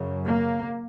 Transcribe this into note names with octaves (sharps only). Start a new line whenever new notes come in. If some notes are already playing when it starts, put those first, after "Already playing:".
Already playing: F#2 C#3
A#3